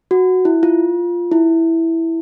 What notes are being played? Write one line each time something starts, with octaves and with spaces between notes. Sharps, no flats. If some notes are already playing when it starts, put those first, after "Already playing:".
F#4
E4
F4
E4